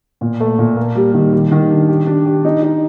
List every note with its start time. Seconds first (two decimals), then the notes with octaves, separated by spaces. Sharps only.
0.21 A#2
0.40 A3
0.59 A#2
0.77 A#3
0.96 G3
1.14 D#3
1.33 G3
1.52 D#3
1.71 D4
1.89 G4
2.07 D4
2.26 G4
2.45 D#4
2.63 D#4